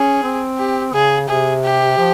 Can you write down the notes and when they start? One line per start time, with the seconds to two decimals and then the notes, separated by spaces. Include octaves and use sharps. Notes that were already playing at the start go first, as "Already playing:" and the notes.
Already playing: C#4 G#4
0.23 C4
0.58 G4
0.93 C#3 G#4
1.28 C3 G#4
1.64 G4
1.98 F3